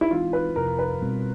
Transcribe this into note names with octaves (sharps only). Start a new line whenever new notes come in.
E4
E3 G#3 C4 D#4 F4
B4
F2 C3 F3 A#4
B4
B2 G3 C4